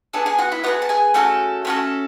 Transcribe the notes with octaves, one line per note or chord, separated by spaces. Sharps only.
B3 D4 G#4 A4 A5
G#4 G#5
F#4 F#5
E4 E5
B3 D4 F#4 G#4 F#5
A5
G#4 G#5
A3 C#4 F#4 A4
A3 C#4 F#4 A4